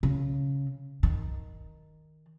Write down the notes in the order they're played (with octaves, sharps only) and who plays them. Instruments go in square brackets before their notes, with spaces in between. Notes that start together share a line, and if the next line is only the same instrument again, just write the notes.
[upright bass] C#3
D#3